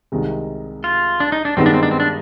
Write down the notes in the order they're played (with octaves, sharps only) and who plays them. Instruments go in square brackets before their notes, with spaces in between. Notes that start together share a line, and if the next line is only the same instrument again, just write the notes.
[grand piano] C2 C3 D#3 G#3
[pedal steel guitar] F4
D4
D#4
D4
[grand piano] G2 D#3 G#3 B3 D#4 [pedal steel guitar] C4
[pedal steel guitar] D4
C4
D4
C4
D4